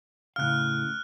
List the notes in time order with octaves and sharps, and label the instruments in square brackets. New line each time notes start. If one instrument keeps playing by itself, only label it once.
[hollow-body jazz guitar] A2 C#3 F5 [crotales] F6 F#6